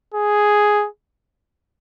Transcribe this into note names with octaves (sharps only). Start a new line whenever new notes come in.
G#4